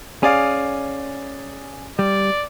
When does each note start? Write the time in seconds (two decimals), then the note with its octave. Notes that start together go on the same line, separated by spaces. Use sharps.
0.23 C#4 G#4 D5 F5
1.99 G3 D5